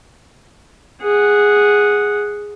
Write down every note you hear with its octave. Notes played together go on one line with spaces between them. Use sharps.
G#4 F#5